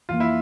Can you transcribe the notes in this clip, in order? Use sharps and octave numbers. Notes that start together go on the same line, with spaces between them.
F2 E3 A#3 F4
E4